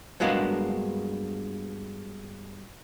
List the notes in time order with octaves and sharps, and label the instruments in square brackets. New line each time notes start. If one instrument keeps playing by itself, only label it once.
[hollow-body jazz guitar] G2 F#3 G#3 A#3 B3 D4